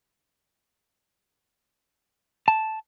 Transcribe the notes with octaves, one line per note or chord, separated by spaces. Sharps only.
A5